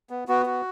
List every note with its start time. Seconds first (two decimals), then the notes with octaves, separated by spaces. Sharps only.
0.10 B3
0.28 B3 F#4
0.46 F#4